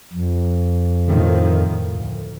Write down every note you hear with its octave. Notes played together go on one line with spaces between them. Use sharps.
F2
A2 D#3 F3
D2